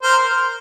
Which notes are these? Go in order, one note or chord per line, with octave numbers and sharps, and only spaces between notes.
A#4 C5